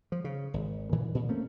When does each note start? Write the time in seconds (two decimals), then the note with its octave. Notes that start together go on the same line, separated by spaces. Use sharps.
0.12 F3
0.24 C#3
0.54 G#1
0.92 A#2 D#3 E3
1.15 A#2
1.29 A3 A#3 C4 C#4